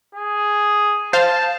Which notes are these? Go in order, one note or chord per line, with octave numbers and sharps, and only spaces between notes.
G#4
C5 F5 A5